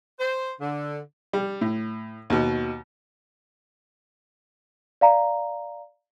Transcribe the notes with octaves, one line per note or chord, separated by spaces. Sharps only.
C5
D3
G3
A2
D#2 B2
D5 F5 A#5